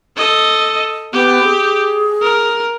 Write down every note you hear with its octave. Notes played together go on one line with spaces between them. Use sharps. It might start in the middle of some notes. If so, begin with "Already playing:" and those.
A4 D#5
B3 G4
G#4
A#4